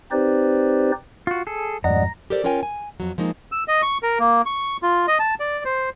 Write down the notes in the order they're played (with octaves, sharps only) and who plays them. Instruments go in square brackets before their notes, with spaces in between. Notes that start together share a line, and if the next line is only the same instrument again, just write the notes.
[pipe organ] C4 D#4 G4 B4 C5 D5
[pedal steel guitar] F4 F#4
G#4 A4
[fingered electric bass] F2 G#2 [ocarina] D5 [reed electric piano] D#5 F#5 [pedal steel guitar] A#5
[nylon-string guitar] G4 A4 A#4 C5 D5
C#4 F4 A#4 C#5 G5 G#5
G#5
F2 F#3
F3 G#3 A#3 D#4
[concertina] E6
D#5
C#6
A#4
A#3
C#6
F4
D#5
A5
D5
C5